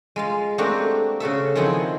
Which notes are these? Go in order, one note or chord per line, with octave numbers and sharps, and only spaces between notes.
G#3 F4 F5
A3 A#3 C4 D4 F#4 G4
C#3 F#4 A4 E5
D#3 F3 C4 E4 G#4 F#5